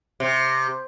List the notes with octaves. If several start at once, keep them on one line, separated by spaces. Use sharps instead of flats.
C3